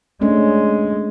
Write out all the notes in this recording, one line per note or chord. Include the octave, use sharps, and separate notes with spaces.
G#3 A3 C#4 D4